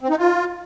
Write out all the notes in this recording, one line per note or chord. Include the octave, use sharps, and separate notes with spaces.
C4
D#4
F4